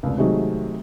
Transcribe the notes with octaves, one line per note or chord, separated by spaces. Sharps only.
F1 C#2
C3 D#3 F#3 G#3 A3 C4